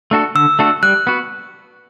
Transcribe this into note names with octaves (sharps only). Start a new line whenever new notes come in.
A3 D4 F#4 A4
D3 E6
A3 D4 F#4 A4
G3 F#6
B3 F#4